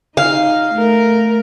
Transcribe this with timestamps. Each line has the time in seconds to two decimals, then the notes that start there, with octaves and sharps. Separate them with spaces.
0.17 D#4 F5
0.75 A3 A#4